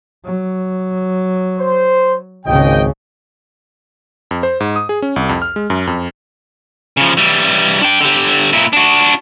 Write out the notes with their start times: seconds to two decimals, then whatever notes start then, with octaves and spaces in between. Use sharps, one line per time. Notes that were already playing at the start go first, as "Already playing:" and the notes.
0.25 F#3
1.59 C5
2.46 G#1 C#2 C#3 D#5 G5
4.31 F2
4.43 C5
4.60 G#2
4.76 D#6
4.89 G#4
5.02 C#4
5.16 C2
5.29 F2
5.42 F6
5.56 G#3
5.70 F#2
5.87 F2
6.97 C#3 F3
7.17 E3 G3
7.82 D4 G5
8.01 D3 G4
8.53 A#2 E4
8.73 D4 F#4